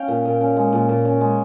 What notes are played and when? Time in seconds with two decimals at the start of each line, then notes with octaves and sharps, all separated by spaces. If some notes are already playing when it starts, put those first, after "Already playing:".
Already playing: C#4 F5 G5
0.08 A#2
0.25 A#2
0.41 C#4
0.57 G#3
0.72 A#2
0.89 A#2
1.05 C#4
1.21 G#3